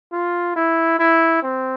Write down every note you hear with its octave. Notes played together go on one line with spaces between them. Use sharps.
F4
E4
E4
C4